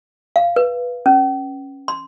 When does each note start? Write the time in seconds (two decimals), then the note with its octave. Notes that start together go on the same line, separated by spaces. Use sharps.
0.36 F5
0.56 B4
1.06 C#4
1.88 C6